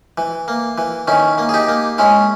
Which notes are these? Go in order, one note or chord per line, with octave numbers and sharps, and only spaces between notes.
E3
A#3
E3
D#3 C#4 E4
A#3
G#4
D#4 G4
A#3
G#3 C#4 E4